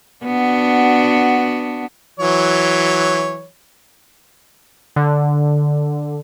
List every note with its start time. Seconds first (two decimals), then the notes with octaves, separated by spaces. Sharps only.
0.24 B3 D4 F#4
2.19 E3 F#3 C#5
4.96 D3